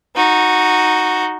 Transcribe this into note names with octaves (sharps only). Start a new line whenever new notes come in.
D#4 F#4